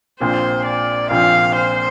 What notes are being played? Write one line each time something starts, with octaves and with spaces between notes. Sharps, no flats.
A#1 A#2 F3 C4 C5
D5
A#1 A#2 F3 C4 F5
C5